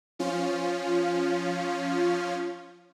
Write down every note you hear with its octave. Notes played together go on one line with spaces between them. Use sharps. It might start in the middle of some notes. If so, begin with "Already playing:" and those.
F3 C#4 F4